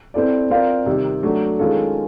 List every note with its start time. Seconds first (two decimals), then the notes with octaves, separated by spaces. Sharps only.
0.14 C4 E4 A4 D5
0.51 C4 F4 A#4 D5 F5
0.86 C3 D#3 G3
1.23 F#3 A3 D4 F#4
1.59 D#3 G#3 C#4 F4 A4